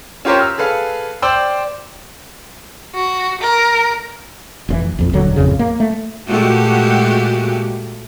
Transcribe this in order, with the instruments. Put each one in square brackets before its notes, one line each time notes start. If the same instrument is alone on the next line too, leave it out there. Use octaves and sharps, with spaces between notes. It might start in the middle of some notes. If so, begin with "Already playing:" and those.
[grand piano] C#4 F4 G4 A#4 C5 C#5
E6 F6
G#4 A4 B4 F5
C5 D5 G5 C6 E6
[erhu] F#4
A#4
[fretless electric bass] F1 A#2 E3
A#1 F2
D#1 D3 F#3
A1 F2 C#3
A#3
A3
[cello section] A#2 G#3 A3 F#4 G4